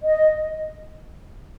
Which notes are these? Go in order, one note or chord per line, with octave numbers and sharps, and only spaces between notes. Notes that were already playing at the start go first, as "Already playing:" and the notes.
D#5